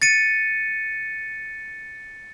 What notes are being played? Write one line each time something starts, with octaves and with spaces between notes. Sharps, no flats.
A6 C#7 D#7